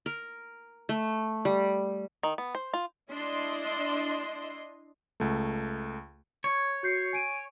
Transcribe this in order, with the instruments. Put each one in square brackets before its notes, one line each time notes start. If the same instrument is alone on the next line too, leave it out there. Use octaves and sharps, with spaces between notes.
[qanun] A#4
A3
G3
[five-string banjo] D#3
B3
C5
F4
[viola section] D4 E4 D#5 C6
[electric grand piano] C#2 A3
[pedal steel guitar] C#5 [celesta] C#6 G#6
[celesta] F#4 G6 C7
G#5 D7 D#7